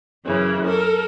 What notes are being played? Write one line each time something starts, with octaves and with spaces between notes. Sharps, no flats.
F#2 C#3 E3
A4 A#4